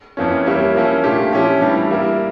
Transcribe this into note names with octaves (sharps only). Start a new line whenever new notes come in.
F2 E3 A#3 C#4
G3 A#3 E4 G4 C#5
F3 A#3 C#4 E4
A#2 A3 D4 G4
F3 C#4 E4 G4
A2 E3 G3 D4
G3 A#3 E4 A#4